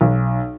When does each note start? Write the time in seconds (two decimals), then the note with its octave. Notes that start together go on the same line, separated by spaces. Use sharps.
0.01 B1